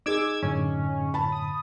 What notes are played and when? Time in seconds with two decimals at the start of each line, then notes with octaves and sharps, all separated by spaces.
0.06 D#4 G#4 D6 E6 G#6
0.43 F#2 A2 D3 C#4
1.14 A5 B5
1.32 D#6